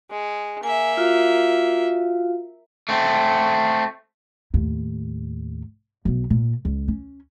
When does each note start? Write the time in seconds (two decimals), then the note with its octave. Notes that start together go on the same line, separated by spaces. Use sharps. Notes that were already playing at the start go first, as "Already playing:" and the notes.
0.10 G#3
0.63 A#3 E5 G#5
0.97 F4 F#4 F5
2.89 A3 C4
4.54 D#2 A2
6.05 B1 B3
6.30 A#2
6.65 C#2
6.88 C#4